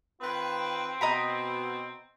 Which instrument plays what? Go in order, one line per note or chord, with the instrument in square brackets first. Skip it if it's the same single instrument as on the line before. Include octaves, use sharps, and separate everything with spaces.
[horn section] D#3 F4 B4 [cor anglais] C4
[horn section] B2 [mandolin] D#5 A#5 B5